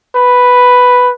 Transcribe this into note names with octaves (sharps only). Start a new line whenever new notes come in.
B4